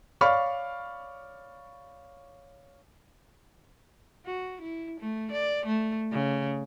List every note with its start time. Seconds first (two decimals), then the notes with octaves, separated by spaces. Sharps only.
0.21 C#5 D5 F5 B5 C#6 F6
4.26 F#4
4.61 E4
5.00 A3
5.31 D5
5.66 A3
6.11 C#3